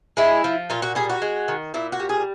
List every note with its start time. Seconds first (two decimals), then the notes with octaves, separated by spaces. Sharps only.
0.17 G#3 E4
0.44 F3
0.70 A#2 F4
0.82 F#4
0.95 G3 G#4
1.10 F#4
1.22 G#3
1.48 D#3
1.74 A#2 E4
1.92 F#4
2.00 G3
2.09 G#4